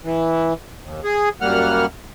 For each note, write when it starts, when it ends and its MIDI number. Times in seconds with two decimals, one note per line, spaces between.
0.04 0.53 52
0.84 1.01 39
1.04 1.29 68
1.41 1.86 42
1.41 1.86 55
1.41 1.86 58
1.41 1.86 78
1.41 1.86 89